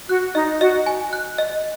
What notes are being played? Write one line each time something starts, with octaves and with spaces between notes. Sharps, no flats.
F#4 F#6
D#4 D#5
F#4 D#5
G#5
F#6
D#5